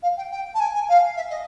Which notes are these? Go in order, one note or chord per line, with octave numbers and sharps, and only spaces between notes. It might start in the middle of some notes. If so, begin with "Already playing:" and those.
F5
G5
G5
A5
G#5
G#5
F5
E5
D#5